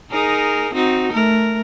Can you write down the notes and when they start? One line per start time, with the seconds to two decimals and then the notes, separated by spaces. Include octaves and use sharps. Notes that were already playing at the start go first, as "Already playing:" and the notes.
0.11 D#4 G#4 A#4
0.74 C4 D#4 F#4
1.13 A3 A#4